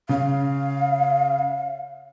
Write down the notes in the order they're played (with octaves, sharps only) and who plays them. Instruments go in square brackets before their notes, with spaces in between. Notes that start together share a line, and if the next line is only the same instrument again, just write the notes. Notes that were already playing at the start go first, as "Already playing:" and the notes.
[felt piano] C#3 [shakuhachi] F5